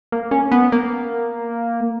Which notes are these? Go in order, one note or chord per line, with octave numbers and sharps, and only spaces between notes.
A#3
C#4
B3
A#3